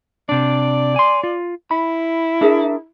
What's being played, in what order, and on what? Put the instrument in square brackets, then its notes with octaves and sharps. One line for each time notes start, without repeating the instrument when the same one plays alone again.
[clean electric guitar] C3 D4 [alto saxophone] D5
[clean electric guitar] G#5 C6
F4
[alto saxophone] E4 [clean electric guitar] B5
[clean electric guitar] D4 [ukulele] G#4 A#4 E5